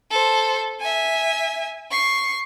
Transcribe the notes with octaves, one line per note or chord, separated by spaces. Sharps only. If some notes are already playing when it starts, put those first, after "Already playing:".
A4 C5
E5 G#5
C#6 C7